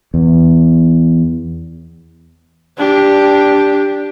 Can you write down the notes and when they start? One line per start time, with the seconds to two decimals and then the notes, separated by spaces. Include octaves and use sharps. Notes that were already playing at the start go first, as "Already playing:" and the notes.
0.14 E2
2.78 D4 G4